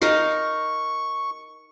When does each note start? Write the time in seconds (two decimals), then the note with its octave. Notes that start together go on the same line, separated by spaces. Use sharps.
0.02 D#4 A#4 F5 C#6